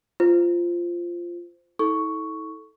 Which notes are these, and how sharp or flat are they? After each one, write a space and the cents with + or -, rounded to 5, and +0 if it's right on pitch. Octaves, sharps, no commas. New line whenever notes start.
F4 -10 C5 -10
E4 -45 A4 -15 C#6 +5